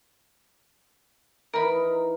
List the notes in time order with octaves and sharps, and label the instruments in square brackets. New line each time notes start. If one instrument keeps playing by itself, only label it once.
[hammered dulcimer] E3 D#4 [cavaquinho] A#4 B5